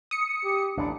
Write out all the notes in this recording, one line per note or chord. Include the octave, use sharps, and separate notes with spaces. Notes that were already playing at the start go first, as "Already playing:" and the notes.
D#6 C#7
G4
A1 D#2 D4